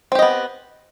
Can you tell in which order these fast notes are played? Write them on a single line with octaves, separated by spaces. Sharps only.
C4 G4 D#5 B3